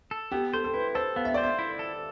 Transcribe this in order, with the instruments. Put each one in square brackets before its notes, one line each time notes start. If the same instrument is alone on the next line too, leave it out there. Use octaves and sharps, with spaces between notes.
[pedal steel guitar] A4
[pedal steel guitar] B3 [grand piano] G4
[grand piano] A4 [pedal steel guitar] C5
[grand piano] A4
[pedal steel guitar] E4 [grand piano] B4
[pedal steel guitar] A4 [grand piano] C5
[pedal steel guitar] B3 [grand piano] F5
[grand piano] E5
[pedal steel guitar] C5 [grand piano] D5
[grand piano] E5
[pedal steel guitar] E4
A4